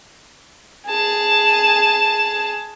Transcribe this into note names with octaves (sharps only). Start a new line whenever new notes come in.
G#4 A5